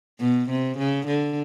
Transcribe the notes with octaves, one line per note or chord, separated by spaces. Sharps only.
B2
C3
C#3
D3